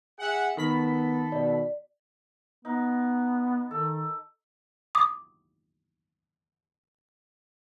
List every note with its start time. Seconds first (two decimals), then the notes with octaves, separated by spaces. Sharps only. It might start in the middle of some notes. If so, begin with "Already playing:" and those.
0.19 G#4 E5 F#5
0.57 D#3 B3 A4 B5 B6
1.32 B2 D5
2.65 B3 D#4
3.71 D#3 A4
4.95 D6 D#6